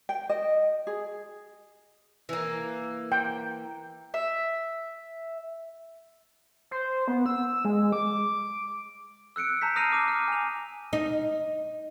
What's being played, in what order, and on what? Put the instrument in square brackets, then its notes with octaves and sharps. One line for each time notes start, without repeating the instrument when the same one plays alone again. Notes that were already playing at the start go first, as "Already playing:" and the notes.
[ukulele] G5
D#5
G#4
[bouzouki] E3 A#3
[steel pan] G5
[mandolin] E5
[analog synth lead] C5
B3
E6
G#3
D6
[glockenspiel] E6 F#6 C#7 D7
A5 A#5 G6 B6
D#6 F6 A#6 C7 D#7 F7
D6 D#7
F6
G#5 F7
[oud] D#4